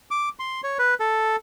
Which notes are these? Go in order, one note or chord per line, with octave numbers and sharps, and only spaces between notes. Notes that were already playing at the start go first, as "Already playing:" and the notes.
D6
C6
C#5
B4
A4